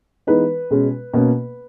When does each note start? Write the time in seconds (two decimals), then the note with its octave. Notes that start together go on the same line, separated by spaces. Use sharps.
0.27 E3 G#3 B3 D#4 B4
0.71 B2 G#3 C#4
1.14 B2 A#3 C#4